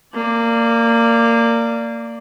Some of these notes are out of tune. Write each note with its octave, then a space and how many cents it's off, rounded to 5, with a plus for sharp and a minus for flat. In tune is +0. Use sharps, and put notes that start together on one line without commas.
A#3 -20 D5 +0